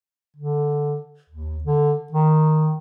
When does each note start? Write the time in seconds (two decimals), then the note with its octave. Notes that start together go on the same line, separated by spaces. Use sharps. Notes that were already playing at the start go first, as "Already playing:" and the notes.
0.36 D3
1.30 D#2
1.64 D3
2.12 D#3